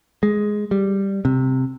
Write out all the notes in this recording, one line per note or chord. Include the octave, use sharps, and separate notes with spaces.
G#3
G3
C3